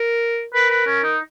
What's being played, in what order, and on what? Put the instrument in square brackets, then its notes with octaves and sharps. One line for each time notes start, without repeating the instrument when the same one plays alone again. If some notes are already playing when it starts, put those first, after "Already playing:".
Already playing: [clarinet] A#4
[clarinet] A#4 [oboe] B4
[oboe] B4
C#4
D#4